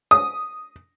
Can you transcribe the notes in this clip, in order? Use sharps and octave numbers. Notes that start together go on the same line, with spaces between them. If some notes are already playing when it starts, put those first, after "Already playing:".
D#6